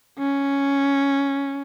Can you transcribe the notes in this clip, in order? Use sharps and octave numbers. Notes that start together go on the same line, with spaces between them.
C#4